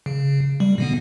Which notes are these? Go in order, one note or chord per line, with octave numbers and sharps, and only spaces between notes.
C#3
G3
B2 D3 B3